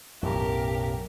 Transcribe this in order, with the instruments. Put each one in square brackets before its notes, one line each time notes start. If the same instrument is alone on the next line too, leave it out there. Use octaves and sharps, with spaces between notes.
[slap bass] B1 F#2 A2 [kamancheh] G4 A#4